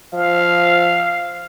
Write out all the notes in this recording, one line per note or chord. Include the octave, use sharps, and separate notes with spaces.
F3 F5